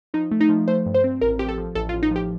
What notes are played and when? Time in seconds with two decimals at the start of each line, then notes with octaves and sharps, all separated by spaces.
0.14 F3 D#4
0.31 A3
0.41 D#4
0.49 F3
0.68 A3 C5
0.86 G2
0.94 C5
1.04 C4
1.21 A1 A#4
1.39 F3 G4
1.48 A4
1.58 F3
1.75 A1 A4
1.89 F4
1.93 A1
2.03 D#4
2.11 F3 G4